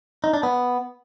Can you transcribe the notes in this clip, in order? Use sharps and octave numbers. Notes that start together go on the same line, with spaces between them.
D#4
D4
B3